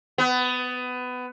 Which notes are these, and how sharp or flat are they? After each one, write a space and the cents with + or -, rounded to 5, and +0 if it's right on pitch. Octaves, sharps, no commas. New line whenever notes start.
B3 +20